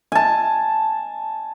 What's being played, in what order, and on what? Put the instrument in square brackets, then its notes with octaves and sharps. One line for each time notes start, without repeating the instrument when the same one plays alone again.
[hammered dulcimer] G#5 A5